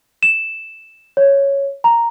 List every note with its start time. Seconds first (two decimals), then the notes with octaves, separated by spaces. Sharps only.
0.23 E7
1.17 C#5
1.84 A#5